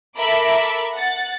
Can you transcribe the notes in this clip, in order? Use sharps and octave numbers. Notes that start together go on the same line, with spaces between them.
A4 A#4 E5 B5 D6
F#5 A6